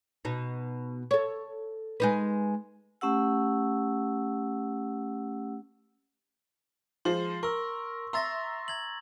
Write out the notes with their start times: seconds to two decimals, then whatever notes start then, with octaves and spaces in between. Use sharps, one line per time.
0.25 B2 D#4
1.11 A4 C#5
2.00 G#3 D#4 B4
3.01 A3 C#4 G4 F#5 E6
7.05 F3 G#3 C5 C6
7.43 A#4 C#6 E6
8.13 E5 A#5 C6 E6 A6 A#6
8.68 A#5 G#6 F#7